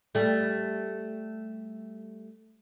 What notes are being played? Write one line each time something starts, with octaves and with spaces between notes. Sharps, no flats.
G3 A3